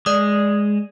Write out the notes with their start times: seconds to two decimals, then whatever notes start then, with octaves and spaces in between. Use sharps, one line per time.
0.06 G#3 D5 D#6